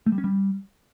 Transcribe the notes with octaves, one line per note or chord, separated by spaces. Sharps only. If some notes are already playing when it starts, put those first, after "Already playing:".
A3
G3
C#4
G3